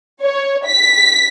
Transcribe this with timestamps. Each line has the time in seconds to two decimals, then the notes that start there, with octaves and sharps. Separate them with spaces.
0.22 C#5
0.66 B6